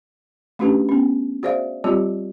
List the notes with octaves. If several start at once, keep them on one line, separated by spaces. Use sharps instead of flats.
A3 C#4 D4 F#4 G4 B4
B3 C#4
F#4 G#4 C5 D5 E5 F5
G3 C4 F4 G4 C#5 D5